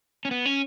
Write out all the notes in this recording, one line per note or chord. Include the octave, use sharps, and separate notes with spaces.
C#4
B3
C#4